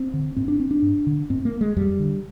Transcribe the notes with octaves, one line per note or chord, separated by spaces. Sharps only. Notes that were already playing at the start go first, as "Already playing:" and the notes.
Already playing: C4
D3
G#2 C4
D4
C4
D4
G2
D3
G#2 C4
A#3
G#3
F2 G3
D3